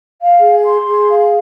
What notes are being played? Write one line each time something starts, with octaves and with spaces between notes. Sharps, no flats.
F5
G#4
C6
G#4
F5